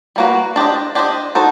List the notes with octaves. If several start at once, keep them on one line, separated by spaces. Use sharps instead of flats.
G3 A#3 C#4 F#4 B4
D4 G4 C5 D#5
D4 G4 C5 D#5
D#4 F#4 A4 C5